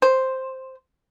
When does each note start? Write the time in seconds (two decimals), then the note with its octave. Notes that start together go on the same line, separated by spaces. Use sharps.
0.02 C5